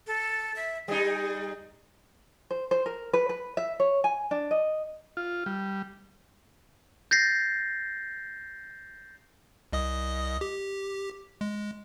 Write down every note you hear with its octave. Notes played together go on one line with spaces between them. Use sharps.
A4
E5
G3 D#4 G#4
C5
C5
A#4
B4
B4
E5
C#5
G#5
D4
D#5
F4
G3
G6 A6 A#6 C7
C2 D#5 D#6
G4
G#3